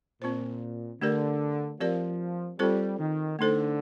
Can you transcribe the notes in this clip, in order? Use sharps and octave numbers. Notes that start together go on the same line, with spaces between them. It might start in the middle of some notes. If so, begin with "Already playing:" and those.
A#2 C4 F4 C5
D3 A3 D4 G4 A#4 D5
F3 C4 G4 A#4 D5
G3 C4 F4 A4 C5
D#3
D3 A3 D#4 A4 C5